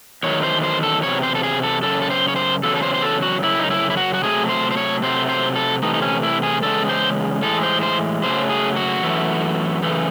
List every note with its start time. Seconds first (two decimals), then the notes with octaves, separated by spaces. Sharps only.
0.23 E2 D#3 F#3 A3 C#5
0.43 C5
0.63 C5
0.83 A4
1.03 E2 C3 F#3 C#5
1.23 C5
1.35 A4
1.43 G#4
1.63 A4
1.83 F#2 C#3 A4
2.02 A4
2.10 C5
2.28 C#5
2.36 C5
2.63 E2 C#3 F#3 A4
2.76 A4
2.82 C5
2.94 C5
3.02 A4
3.22 F#4
3.42 F#2 C#3 E4
3.59 D#4
3.70 E4
3.90 E4
3.97 F#4
4.14 F#4
4.23 C3 F#3 A3 G#4
4.49 C5
4.71 C5
4.77 C#5
5.02 C3 F#3 A3 C5
5.29 C5
5.56 A4
5.82 C3 E3 A3 D#4
5.94 D#4
6.02 C#4
6.23 E4
6.43 G#4
6.63 E2 C#3 G#3 A4
6.89 C5
7.42 A2 E3 G#3 A4
7.63 C5
7.83 C5
8.23 F#2 C#3 F#3 A3 C5
8.49 G#4
8.77 F#4
9.03 F#2 E3 A3
9.83 F#2 C#3 E3 A3